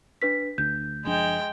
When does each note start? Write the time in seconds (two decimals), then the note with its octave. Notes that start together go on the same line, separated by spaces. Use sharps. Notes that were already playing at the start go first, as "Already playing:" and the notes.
0.22 D4 B4 B6
0.58 D2 D4 G6
1.05 F#1 F3 G#3 D4 G5